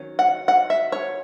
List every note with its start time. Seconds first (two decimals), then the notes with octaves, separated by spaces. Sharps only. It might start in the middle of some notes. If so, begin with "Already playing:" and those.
Already playing: D#3 F#3 C#4
0.19 F#5
0.48 F#5
0.70 E5
0.92 C#5